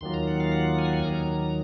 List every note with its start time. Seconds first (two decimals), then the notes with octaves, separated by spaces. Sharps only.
0.01 D#2 D#3 F#3 A#3 F4 C6
0.14 A#5
0.27 F#5
0.40 F5
0.52 F#5
0.78 G#5
0.85 F#5
0.94 G#5
1.03 D#2 D#3 F#3 A#5